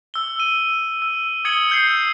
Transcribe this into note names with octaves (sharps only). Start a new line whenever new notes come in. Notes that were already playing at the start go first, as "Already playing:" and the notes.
E6 G7
D#7
E6
D#6 G#6 C#7 F#7 G7
E6 G6 C7